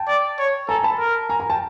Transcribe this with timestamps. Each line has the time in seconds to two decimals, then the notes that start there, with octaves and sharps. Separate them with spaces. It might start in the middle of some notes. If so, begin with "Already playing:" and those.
Already playing: G5 A5
0.08 D5
0.39 C#5
0.68 A4 G#5 A#5
0.83 A5 B5
0.99 A#4
1.30 G#5 A#5
1.40 G#5 A#5
1.50 G5 A5